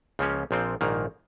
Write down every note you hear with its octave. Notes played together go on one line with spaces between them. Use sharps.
C#2 C#3 F3 A#3 C#4
A#1 A#2 F3 C4
A#1 G#2 D#3 A#3